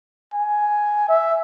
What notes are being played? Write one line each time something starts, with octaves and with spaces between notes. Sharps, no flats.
G#5
E5